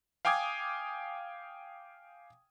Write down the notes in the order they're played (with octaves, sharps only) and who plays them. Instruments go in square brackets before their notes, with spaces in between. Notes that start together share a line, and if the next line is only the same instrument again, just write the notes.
[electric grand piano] F5 G5 G#5 D6 D#6 G#6